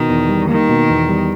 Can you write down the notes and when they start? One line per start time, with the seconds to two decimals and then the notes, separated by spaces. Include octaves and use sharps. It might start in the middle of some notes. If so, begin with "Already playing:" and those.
Already playing: B2 D#3
0.09 E2
0.29 G3
0.49 D#3 A#3
0.69 B2
0.90 E2
1.09 G3